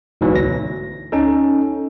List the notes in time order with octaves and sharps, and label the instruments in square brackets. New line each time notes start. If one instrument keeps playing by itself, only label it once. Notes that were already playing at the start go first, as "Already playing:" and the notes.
[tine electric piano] B1 G#2 B2 E3 F#3
D2 A#6
C#4 D#4 A4